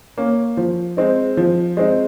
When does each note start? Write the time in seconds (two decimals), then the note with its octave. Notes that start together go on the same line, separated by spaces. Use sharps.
0.18 A#3 C#4
0.57 F3
0.97 G#3 C4 D#4
1.37 F3
1.77 G#3 C4 D#4